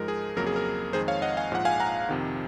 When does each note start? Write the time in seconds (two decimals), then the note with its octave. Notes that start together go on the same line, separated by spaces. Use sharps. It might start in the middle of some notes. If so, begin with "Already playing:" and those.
Already playing: G#2 F3 G#3 A#4
0.08 G#4
0.36 F2 C#3 F#3 A#3 A#4
0.47 G#4
0.56 A#4
0.93 F2 D#3 G#3 G#4 C5
1.08 C#5 F5
1.22 D#5 F#5
1.37 F5 G#5
1.51 A#1 G#2 F3 F#5
1.65 F5 G#5
1.80 F#5 A#5
2.09 F2 C3 D#3